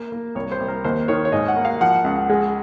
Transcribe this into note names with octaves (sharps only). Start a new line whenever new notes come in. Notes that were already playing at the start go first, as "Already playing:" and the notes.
Already playing: A#3
A#3
C2 C#5
C5
C2
A#4
D#2 C5
D#3 C#5
C#5
G#2 D#5
F#5
A#3
F5
F3 F#5
C#2
G#3